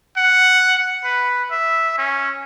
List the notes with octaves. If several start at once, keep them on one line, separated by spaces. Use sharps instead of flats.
F#5
B4
E5
C#4